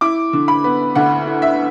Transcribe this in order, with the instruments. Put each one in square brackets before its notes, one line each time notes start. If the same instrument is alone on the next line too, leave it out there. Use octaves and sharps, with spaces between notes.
[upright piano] E4 D6
D3
B5
B3
D2 F#5
E4
E5